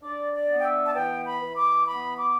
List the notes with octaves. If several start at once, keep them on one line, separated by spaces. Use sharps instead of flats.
D4 D5
D5
B3
G5
E5
A5
E3 G5
B5
E3
D6
B3 B5
D6